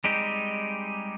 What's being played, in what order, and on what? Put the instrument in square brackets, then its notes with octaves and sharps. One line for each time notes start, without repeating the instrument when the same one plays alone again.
[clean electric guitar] G3 G#3 C4 D#4 G4